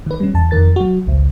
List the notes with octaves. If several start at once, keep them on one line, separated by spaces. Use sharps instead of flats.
D#3 B4
G3 C#4
E2 A5
F2 D#3 A#4 A6
F#3 F#4
G#1 C#2